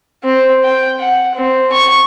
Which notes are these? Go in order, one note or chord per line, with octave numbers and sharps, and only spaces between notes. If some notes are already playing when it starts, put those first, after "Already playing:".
C4
G5
F#5
C4
C#6